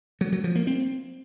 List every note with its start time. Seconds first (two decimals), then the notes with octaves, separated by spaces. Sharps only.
0.21 F#3
0.32 F#3
0.44 F3
0.55 A#3
0.67 C4